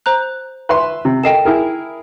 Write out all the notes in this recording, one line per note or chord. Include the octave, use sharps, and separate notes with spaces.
C5 A#5 F#6
B4 E5 C6
C3
A4 A#4 D#5 G5 C7 E7
E4 G#4 A#4